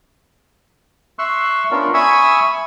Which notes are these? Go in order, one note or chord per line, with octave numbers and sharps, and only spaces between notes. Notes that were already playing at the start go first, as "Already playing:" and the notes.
E5 C6 C#6 E6 F#6
B3 C#4 D4 F4 A#4
E5 G#5 B5 C#6 D#6 E6